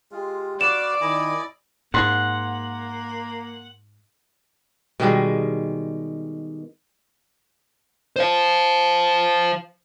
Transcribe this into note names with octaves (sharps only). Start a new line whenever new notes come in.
G#3 F4 G4
F#4 B4 D5 F5 E7
D#3 E4 D#5 G#5
G#2 A#3 F#5 C6
B2 D#3 G3 G#3
C5 F5